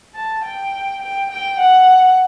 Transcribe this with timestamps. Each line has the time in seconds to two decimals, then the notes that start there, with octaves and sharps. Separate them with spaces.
0.15 A5
0.44 G5
1.02 G5
1.31 G5
1.59 F#5